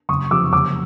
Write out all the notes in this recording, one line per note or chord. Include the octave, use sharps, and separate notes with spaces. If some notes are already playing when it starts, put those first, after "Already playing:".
F#1 C#6 D#6
F2 C3 F3 D6 E6
F#1 D6 E6